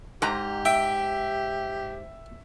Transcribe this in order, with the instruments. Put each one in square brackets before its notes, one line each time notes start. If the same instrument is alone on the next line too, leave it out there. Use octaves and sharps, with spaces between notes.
[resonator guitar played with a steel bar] G#2 A#5 [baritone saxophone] G4
[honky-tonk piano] E5 [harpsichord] G5